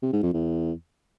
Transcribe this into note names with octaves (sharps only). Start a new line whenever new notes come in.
C3
G#2
F2
E2